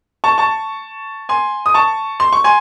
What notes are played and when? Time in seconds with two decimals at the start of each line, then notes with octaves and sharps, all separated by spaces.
0.24 A5 C#6
0.38 A5 C#6
1.29 G#5 C6
1.66 D#6
1.74 A5 C#6
2.20 C6
2.33 C#6
2.44 G#5 C6